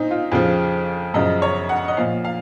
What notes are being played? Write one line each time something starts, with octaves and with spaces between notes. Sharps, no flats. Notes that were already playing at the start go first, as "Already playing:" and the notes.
Already playing: A#2 C4 D#4
F4
F2 C#3 F3
F#2 C#3 F3 D#5
C#5
F#5
D#5
A#2 F3 F5
F5